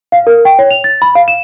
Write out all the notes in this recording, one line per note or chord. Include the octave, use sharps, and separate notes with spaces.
F5
A#4
G5
C#5
F7
A6
B5
F5
E7